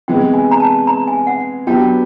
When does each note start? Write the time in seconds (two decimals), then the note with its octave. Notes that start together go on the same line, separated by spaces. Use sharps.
0.08 C3 E3 G#3 B3 G5
0.34 G#5
0.51 A#5
0.60 A5
0.87 A#5
1.08 G#5
1.27 F#5
1.67 F#3 B3 D4 G4 G5